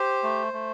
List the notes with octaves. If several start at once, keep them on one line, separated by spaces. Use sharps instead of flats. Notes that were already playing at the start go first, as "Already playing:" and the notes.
Already playing: G4 C5
A3
A3